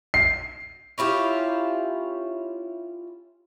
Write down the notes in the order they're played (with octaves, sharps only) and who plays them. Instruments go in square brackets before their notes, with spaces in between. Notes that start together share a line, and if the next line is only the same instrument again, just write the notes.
[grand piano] C7
[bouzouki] C#4 E4 F4 G4